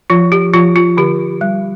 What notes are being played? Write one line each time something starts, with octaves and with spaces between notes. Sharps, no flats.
F3 F4
G4
F3 F4
F4
D3 G4
G3